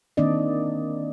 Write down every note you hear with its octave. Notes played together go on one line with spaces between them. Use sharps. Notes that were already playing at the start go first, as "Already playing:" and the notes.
D#3 A#3 C4 D4 D5 D#5